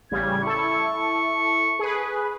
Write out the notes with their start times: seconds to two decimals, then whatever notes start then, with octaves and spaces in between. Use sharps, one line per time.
0.11 A1 C#3 G3 G#6
0.43 E4 A4 C#6
1.79 G#4 B4